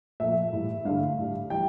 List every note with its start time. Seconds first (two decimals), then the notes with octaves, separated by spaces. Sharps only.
0.20 A#2 F3 A3 E5
0.52 A2 E3 G3
0.85 G2 D3 A3 F5
1.18 A2 G3
1.50 E3 G3 G5